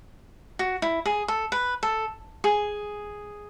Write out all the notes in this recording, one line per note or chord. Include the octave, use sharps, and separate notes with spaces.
F#4
E4
G#4
A4
B4
A4
G#4